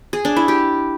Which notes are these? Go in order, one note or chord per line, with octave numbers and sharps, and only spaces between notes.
G#4
D4
E4
G4